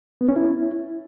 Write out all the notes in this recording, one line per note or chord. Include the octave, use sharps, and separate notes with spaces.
B3
C#4
E4